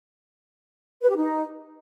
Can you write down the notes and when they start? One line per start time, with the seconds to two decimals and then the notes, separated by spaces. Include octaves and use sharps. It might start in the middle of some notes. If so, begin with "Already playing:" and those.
1.02 B4
1.09 G4
1.16 D#4